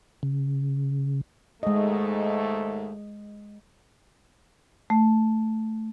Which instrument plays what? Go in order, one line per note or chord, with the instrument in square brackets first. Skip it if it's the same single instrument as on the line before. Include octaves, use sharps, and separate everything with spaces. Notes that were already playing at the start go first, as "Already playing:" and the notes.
[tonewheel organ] C#3
[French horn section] D#2 G#2 A3 [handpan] G#3 D#5
[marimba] A3